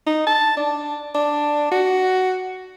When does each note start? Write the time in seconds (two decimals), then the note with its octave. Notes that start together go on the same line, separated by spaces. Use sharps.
0.07 D#4
0.27 A5
0.57 D4
1.15 D4
1.72 F#4